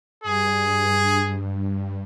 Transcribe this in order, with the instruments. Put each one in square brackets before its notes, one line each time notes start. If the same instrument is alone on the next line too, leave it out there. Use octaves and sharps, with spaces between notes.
[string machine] G2 [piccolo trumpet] G#4